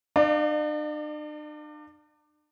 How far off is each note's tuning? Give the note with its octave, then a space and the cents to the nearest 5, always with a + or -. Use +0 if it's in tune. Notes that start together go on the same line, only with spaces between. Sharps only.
D4 +45 D5 +20 F5 +0